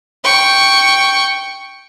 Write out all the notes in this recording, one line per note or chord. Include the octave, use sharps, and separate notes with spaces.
G5 C#6